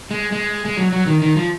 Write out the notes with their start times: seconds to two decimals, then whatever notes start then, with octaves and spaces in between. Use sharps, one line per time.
0.11 G#3
0.32 G#3
0.66 G#3
0.77 F#3
0.93 F#3
1.06 D#3
1.22 D#3
1.37 F3